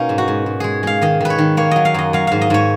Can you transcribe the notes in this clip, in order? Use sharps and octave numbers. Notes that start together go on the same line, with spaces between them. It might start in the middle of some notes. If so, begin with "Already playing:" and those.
Already playing: B2 A#3 C#4 D#4
G#2
F#4
G#2
G#2
G#3 G#4
G#3 F5
D#3 D#5
D#3 B4
C#5
D#3
A#3 C#5
F#3 D#5
F5
F#2 D#5
F#3 F5
G#2 F5
D#5
G#2 C#5